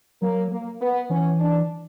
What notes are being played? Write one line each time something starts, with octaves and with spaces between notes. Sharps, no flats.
F#3 A#3
A#3
B3
E3 C#4
D4